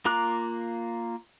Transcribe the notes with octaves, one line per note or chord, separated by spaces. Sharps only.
A#3 F4 A#5 D6 F#6